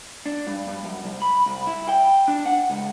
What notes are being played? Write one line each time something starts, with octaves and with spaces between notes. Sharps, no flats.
D4
G2
G2
F#2
C2
B5
C2
E4
G5
D4
F#5
C#2